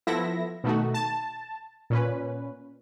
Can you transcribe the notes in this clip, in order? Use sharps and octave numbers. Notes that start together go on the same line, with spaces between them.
F3 B3 E4 A4 E5 A#6
B2 D#3 A3 D#4 F#4
A5
A#2 C#4 B4